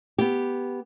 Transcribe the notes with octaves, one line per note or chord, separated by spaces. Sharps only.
B3 G4